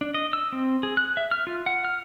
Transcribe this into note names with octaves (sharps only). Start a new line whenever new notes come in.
D4
D#5
E6
C4
G#4
F#6
E5
F6
F4
F#5
F6